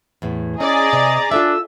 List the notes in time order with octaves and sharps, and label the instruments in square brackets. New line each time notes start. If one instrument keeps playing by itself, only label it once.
[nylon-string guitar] E2 A2
[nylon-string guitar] C#4 [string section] G#4 D5 [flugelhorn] D#5 [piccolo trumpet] A#5
[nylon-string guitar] C3
[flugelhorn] D4 [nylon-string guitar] F4 A4 E5 [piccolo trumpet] E6